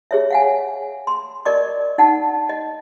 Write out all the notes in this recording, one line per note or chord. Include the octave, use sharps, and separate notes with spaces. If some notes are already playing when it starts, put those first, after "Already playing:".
G#4 C#5 E5
F5 F#5 G#5
C6
A#4 D5 D#5 C#6 D6
D#4 F#5 A5
D#5